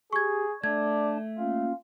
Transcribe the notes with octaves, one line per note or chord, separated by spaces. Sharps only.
G4 G#4 C#6 G#6
A3 D4 D5 A5 G#6
A#3 C#4 F4 F5